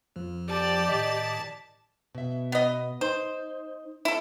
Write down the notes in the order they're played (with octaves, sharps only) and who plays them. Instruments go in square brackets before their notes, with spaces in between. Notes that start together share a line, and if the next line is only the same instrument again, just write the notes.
[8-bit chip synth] F2 [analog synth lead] F3
[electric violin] G4 D5 [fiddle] A5
[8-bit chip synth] A2 D#3 B6 [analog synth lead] D#5
[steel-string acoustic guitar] B2 E5
[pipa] B3 D#5
[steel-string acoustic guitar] D#4 [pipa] C5
[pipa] E4 A4